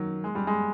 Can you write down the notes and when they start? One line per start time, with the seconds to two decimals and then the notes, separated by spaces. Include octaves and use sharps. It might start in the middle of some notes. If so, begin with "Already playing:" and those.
Already playing: D#3 F#3
0.24 G#3
0.35 G3
0.47 G#3